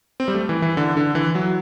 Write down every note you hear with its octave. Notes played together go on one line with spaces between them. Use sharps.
C4
G3
A3
E3
E3
D3
D3
E3
F#3